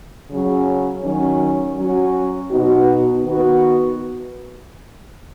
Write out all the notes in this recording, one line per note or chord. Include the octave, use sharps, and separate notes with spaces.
C#3 F#3 C#4
D#3 F#3 C#4
F#3 C#4 F#4
B2 B3 D#4 F#4
D#3 B3 F#4